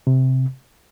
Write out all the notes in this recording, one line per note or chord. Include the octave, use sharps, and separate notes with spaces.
C3